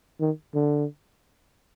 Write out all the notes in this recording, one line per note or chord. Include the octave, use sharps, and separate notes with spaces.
D#3
D3